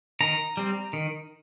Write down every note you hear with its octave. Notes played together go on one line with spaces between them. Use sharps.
D#3 A#5
G3 C4
D#3